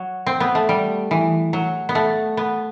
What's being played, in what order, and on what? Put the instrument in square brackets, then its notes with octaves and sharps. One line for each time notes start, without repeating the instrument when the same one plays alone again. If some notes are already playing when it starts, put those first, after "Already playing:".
Already playing: [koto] F#3
C4
B3
A3
G3
E3
F#3
B3
A3
B3